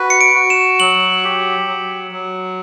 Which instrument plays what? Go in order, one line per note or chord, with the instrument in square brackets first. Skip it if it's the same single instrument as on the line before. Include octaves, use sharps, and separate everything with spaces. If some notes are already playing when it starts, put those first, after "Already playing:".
Already playing: [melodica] F#4 B4
[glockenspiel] C#7
D7
[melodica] F#4
[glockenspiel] E7
[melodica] F#3 [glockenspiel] F#7
[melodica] G4
F#3
F#3